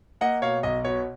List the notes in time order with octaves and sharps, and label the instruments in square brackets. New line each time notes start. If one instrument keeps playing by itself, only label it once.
[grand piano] A#3 D#5 F#5
B2 C#5 F5
B1 D#5
B2 C#5